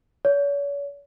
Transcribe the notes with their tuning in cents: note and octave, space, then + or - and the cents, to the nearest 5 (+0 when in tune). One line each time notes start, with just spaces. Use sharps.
C#5 +40